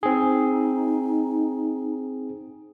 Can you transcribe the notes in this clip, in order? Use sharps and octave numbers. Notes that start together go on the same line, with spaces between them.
C4 D#4 G#4